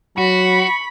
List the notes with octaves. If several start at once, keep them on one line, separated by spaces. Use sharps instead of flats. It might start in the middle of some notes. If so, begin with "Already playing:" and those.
F#3 F#4 B5 C#6